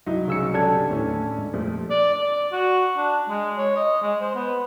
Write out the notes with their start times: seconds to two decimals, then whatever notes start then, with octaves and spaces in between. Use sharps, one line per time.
0.06 C2 G2 F#3 D#4 E4
0.28 G#2 C#3 C#4 E6 C#7
0.54 D3 C#4 D4 G4 A4 G#6
0.89 D#2 A2 D3 E3 C#4
1.38 G#2
1.53 F2 A#2 F3 G3 A3
1.90 D5
2.14 D5
2.53 F#4
2.97 D4
3.29 G#3
3.58 C#5
3.76 D#5
4.02 G#3
4.21 C5
4.35 B3